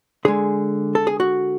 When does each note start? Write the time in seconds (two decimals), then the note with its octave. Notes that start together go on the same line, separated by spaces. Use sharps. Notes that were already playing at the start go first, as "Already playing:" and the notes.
0.25 D3 G#3 G#4
0.95 A4
1.07 G#4
1.20 F#4